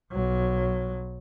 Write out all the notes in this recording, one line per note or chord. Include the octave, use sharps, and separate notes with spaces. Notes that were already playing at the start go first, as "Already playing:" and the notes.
B1 F#3